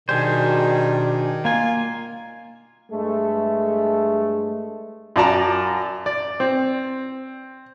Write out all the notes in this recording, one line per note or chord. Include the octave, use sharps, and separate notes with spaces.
B2 D#3 G3 D4 G#4 C5
A#3 F4 G#5
G2 G#3 A3
F#2 F4 D5 A5 A#5
D5
C4